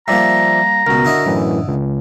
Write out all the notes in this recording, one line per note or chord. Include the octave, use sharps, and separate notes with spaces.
F3 G3 A#3 D5 E5 A#5
C#2 B2 F#4 A#4
D3 E4 D#5
F#2 A2 E3
C#2